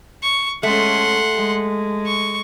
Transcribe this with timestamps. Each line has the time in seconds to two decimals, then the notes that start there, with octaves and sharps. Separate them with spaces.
0.23 C#6
0.63 G#3 A3 C#4 F#5 C6
1.36 G#3
2.06 C#6